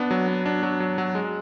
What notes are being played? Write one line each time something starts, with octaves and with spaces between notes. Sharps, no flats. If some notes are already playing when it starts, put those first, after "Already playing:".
Already playing: B3 D4
F#3
B3
D4
F#3
F#3
F#3
G#3